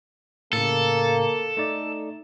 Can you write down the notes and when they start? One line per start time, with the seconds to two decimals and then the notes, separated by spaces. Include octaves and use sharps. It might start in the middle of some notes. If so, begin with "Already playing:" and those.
0.53 A2 C#3 A#3 A4
1.57 A3 D#4 D5